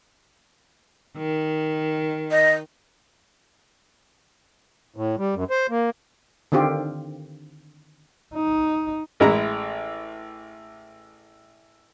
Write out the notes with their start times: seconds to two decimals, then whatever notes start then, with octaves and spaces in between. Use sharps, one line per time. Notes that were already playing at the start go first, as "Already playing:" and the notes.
1.17 D#3
2.31 D#5
4.96 A2
5.18 G3
5.35 F#2
5.50 C5
5.70 A#3
6.52 D3 D#3 C4 F4 G4
8.35 D#4
9.20 A1 G#3 E4 A#5